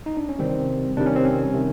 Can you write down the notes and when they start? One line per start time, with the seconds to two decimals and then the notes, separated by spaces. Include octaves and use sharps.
0.06 D#4
0.17 D4
0.29 C#4
0.39 C3 D#3 G3 C4
0.97 C3 D#3 G3 D4
1.06 C#4
1.16 C4
1.25 C#4
1.54 C3 D#3